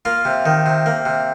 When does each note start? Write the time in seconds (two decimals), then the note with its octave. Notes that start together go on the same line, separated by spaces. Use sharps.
0.05 A#3 F4
0.25 C3
0.46 D#3
0.66 C3
0.86 A#3
1.05 C3